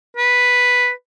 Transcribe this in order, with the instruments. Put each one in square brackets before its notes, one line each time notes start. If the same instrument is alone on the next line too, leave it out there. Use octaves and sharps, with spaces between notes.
[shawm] B4